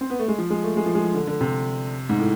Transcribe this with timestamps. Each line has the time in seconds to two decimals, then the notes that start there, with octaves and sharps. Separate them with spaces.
0.01 C4
0.10 B3
0.19 A3
0.28 G#3
0.38 F3
0.50 G#3
0.64 A3
0.77 G#3
0.86 F3
0.95 G#3
1.05 F3
1.14 D3
1.27 D3
1.41 C3
2.09 G#2
2.19 A2